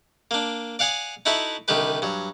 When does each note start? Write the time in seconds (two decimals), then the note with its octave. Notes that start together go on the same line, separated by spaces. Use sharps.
0.31 A#3 D4
0.79 D5 F5 F#5 G#5 D#6
1.26 D#4 E4 F#4 A4 E5
1.68 C2 D3 D#3 G4 B4
2.02 G2 F#3